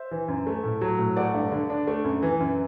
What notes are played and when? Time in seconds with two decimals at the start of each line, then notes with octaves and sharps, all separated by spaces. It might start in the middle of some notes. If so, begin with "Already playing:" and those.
Already playing: C5 E5
0.11 E3
0.28 F#2
0.47 A3
0.64 A2
0.81 F#3
0.99 A2
1.17 A3 D5 F#5
1.34 G2
1.52 D3
1.70 D4
1.87 A3
2.04 F#2
2.22 E3
2.40 F#2